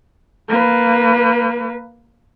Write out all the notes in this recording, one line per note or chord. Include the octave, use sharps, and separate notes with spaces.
A#3 B4